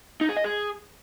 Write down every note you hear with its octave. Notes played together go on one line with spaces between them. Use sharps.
D#4
G#4
D#5
G#4